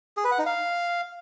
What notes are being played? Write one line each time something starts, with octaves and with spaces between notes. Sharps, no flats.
G#4
B4
F#5
D#4
F5